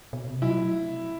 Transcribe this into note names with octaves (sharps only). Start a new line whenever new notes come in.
B2
C3
F#3 E4